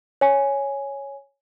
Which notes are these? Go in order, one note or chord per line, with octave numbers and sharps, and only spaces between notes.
C#5 G#5